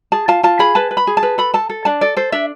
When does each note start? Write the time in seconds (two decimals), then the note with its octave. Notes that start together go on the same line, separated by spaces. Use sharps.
0.12 G#4 A5
0.28 F4 A5
0.43 F4 A5
0.59 G#4 B5
0.75 B4 A5
0.91 B4
0.97 B5
1.07 G#4
1.17 A5
1.23 B4
1.38 A4 B5
1.54 A4 A5
1.70 A4
1.85 D4 A5
2.01 A4 D5
2.17 A4 C5
2.32 D4 E5